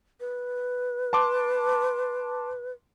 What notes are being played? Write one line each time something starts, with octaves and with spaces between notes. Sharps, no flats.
B4
A5 C6 D6